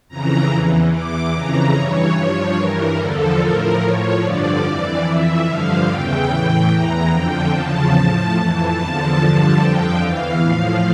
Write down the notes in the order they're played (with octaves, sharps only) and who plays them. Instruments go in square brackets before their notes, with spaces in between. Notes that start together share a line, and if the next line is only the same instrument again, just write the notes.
[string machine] F2 C#3 E3 A#5
E2 E3
E2 E3 D6
F2 C#3 E3 A#5
G2 E3 C#5
G2 F3
G2 E3 A#4
E2 D3 F3 A4
A2 F3 A#4
A2 F3 C#5
G2 D3 F3 D5
F2 E3
F2 E3 E5
G2 D3 F3 F5
E2 C#3 E3 G5
A2 E3
E2 E3 A#5
F2 D3 F3 G5
E2 C#3 F3 A5
A2 F3
F2 E3 A5
E2 D3 F3 A5
G2 D3 F3
F2 D3 F3 G5
E2 E3 F5
A2 F3